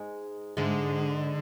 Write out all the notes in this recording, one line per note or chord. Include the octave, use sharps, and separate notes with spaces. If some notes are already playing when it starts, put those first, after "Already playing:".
Already playing: G#2 G#3
G#2 D3 G#3